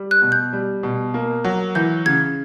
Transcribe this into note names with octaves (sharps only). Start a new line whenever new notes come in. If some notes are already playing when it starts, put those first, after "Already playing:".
Already playing: G3
F#6
B2
G6
G3
B2
A#3
F#3
E3 G6
C#3 G#6